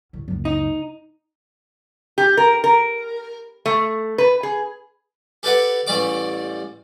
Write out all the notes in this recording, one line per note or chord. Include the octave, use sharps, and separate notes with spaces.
A1 D2
F#1 C#2
D#4
G4
A#4
A#4
A3
B4
G#4
G4 A4 B4 D5 F#5
A1 E2 G3 D5 D6